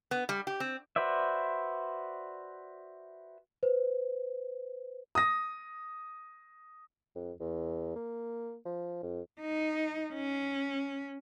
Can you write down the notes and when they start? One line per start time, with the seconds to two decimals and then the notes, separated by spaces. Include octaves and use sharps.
0.11 B3
0.29 G3
0.47 G4
0.60 C4
0.96 F#4 B4 C5 D5 E5
3.63 B4 C5
5.15 D#6 A#6
7.15 F2
7.40 E2
7.96 A#3
8.65 F3
9.03 F2
9.40 D#4
10.14 C#4